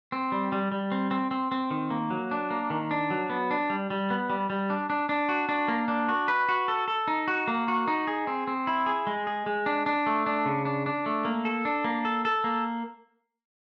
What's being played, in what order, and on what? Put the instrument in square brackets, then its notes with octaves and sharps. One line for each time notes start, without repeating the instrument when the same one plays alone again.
[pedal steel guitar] C4
G3
G3
G3
C4
C4
C4
C4
D#3
A#3
F#3
D4
A#3
D#3
D4
F#3
B3
D4
G3
G3
B3
G3
G3
D4
D4
D4
F#4
D4
A#3
D4
F#4
B4
F#4
A4
A4
D#4
F#4
A#3
F#4
D#4
G#4
C4
C4
E4
G#4
G#3
G#4
G#3
D4
D4
A3
D4
C#3
D4
D4
A3
A#3
A4
D4
A#3
A4
A4
A#3